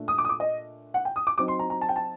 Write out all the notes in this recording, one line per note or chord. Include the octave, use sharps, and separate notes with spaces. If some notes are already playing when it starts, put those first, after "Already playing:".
Already playing: A#2 A3 D4
D#6
D6
D#6
D6
D#5
F#5
G5
D#6
D6
F#3 C4 D#4 D6
C6
A#5
A#5
A5
G5
A5